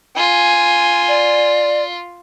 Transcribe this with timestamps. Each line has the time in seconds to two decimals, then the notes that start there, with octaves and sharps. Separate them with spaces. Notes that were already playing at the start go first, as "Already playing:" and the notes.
0.17 F4 G#5
1.08 D5